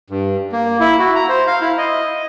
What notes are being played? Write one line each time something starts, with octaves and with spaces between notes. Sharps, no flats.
G2
A#3
E4
F#4
A#5
C5
F5
E4
D#5